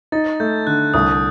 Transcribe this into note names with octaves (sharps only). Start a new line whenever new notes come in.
D#4 A6
A3 G6
D3 F#6
C2 D#6